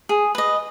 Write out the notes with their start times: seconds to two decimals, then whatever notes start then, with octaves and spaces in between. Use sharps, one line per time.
0.09 G#4
0.35 B4 D#5